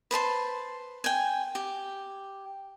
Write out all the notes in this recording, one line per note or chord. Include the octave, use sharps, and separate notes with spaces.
B4 C5 A5 C6
G5 G#5
G4